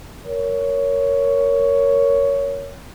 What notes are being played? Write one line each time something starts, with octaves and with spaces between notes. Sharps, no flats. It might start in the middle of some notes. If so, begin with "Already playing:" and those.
A#4 C#5